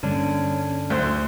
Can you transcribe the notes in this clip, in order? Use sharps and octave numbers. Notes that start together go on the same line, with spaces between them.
G2 D3 G3 A#3 C#4 D4
D2 C5